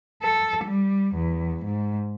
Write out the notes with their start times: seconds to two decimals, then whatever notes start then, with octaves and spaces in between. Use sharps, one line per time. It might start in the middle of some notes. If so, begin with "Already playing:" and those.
0.22 A4
0.64 G3
1.15 E2
1.65 G#2